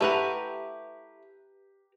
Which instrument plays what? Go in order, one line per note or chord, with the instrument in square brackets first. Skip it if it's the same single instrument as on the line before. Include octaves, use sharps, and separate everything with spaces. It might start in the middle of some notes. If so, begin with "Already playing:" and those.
[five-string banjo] A3 E4 F#5 [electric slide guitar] G4 B4 A#5